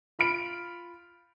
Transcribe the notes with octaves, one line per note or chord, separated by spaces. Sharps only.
F4 B5 F6 D7